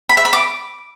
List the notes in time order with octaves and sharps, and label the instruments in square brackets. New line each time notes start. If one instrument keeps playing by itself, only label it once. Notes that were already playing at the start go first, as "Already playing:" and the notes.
[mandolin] B5
E5
B5
D6